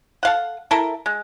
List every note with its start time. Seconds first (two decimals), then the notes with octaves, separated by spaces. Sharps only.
0.23 A4 F5 F#5
0.71 E4 A4 A#4
1.06 G#3